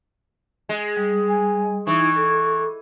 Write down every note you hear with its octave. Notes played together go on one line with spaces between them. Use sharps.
G#3
G3
G#5
E3 D#4 E4 C#6
A4